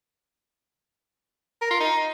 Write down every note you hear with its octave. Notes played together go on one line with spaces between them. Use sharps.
A#4
F4
D#4